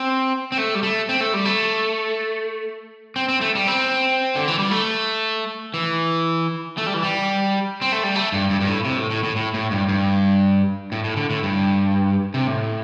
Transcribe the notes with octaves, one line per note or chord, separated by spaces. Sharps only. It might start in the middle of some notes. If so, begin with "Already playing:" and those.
Already playing: C4
C4
A3
G3
A3
C4
A3
G3
A3
C4
C4
A3
G3
C4
D3
E3
G3
A3
E3
A3
G3
E3
G3
C4
A3
G3
A3
G2
G2
G2
A2
C3
A2
A2
A2
A2
A2
G2
G2
A2
A2
D3
A2
G2
C3
A2